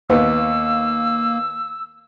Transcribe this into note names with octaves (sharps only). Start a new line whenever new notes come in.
D#2 A#3 B3 E6